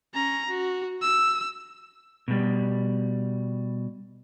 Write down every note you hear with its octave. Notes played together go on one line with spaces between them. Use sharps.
C#4 A#5
F#4
E6
B2 G3